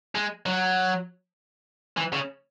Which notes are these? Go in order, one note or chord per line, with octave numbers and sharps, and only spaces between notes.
G#3
F#3
E3
C#3